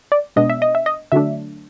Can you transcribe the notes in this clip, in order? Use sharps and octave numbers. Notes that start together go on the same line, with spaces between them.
D5
B2 G#3 B3 D4 D#5
E5
D#5
E5
D#5
D3 F#3 A3 D4 E5